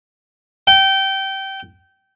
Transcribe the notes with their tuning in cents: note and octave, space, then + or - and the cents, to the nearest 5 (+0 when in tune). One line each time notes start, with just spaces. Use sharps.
G5 -20